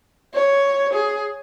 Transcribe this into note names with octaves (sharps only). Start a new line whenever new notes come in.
C#5
G#4